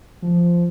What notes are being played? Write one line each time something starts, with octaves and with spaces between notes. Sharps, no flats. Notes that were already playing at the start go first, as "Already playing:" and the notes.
F3